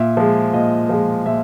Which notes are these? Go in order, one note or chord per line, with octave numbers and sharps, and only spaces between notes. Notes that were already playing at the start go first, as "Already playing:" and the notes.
Already playing: A#2 E5
F3 G#3
A#2 D#5
F3 G#3
A#2 E5